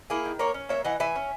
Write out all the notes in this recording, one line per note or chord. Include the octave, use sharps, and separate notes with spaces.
A#3 E4 G#4
D#3
A#3 A#4 C#5
C#4
A#3 C#5 E5
E3 D#5 F#5
E3 E5 G#5
C#4